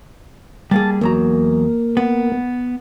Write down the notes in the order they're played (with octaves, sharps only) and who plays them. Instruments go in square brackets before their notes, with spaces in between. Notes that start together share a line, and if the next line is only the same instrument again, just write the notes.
[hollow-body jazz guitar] G3 A#3 G#4 [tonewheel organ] A5
[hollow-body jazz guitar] E2 F#3 A#5 [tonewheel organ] A#3
[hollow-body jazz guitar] B3